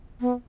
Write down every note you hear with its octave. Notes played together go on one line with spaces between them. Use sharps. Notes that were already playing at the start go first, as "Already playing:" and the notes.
B3